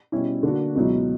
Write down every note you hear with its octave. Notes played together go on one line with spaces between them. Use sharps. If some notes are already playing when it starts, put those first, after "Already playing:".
B2 G3 C#4 E4
D3 A#3 D4 F#4
C#2 B2 F#3 B3 E4